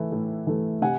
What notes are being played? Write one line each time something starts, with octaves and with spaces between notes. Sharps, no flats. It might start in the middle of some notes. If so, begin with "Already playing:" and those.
Already playing: E3 A3
A2
E3 A3
C3 F#5 G#5